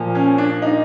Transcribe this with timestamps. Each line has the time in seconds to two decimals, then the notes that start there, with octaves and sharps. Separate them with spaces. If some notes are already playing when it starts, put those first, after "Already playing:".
Already playing: A#2 F3
0.15 C#4
0.38 D4
0.62 D#4